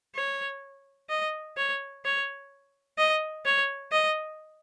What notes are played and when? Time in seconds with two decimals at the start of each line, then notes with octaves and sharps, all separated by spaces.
0.16 C#5
1.10 D#5
1.57 C#5
2.05 C#5
2.98 D#5
3.46 C#5
3.92 D#5